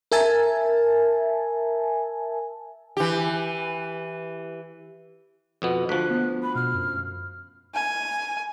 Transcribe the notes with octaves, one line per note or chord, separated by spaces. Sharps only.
A#4 E5 G#5 A5
E3 G4
F2 B2 B3
D2 F3 F#6 B6
B3
B5
B2 F6
F#2
G#5